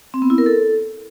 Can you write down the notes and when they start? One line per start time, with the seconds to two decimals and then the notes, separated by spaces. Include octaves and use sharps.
0.14 C4
0.22 B3
0.30 E4
0.38 A#4
0.46 A4